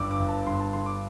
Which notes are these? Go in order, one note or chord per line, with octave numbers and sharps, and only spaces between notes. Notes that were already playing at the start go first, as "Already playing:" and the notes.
Already playing: G1 G2 G3 D6 E6
D6
G1
A5
G2 C6
A5
D3 C6
D6